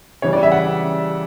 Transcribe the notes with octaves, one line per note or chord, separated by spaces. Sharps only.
C#3 E3 G3 C#5
D5
E5
F#5